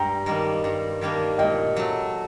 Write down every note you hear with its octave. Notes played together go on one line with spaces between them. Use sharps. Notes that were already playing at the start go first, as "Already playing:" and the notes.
Already playing: G2 G5 A#5
D#3 G3 A#3 D4
G2
D#3 G3 A#3 D4
A#2 D#5 G5
F#3 A3